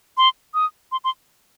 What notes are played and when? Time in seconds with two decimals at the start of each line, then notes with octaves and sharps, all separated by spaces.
0.17 C6
0.54 D#6
0.92 C6
1.04 C6